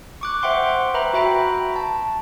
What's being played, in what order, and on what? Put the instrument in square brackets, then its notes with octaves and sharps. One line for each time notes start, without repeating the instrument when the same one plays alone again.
[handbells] C#6 D6 F#6
C5 E5 F#5 G5 C6
B4 E5 G5 A#5 B5
F#4 E5 G5 A#5 B5
A5